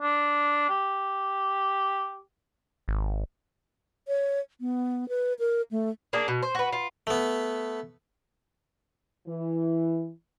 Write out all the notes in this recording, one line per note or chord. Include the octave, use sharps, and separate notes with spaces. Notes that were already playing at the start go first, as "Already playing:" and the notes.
D4
G4
G#1
C#5
B3
B4
A#4
A3
A#3 D4 G#4
B2
C5
F#4 B4
F4
A3 B3
E3